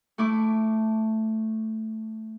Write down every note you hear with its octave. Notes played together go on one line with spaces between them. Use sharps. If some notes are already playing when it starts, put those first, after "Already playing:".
A3 E4 D6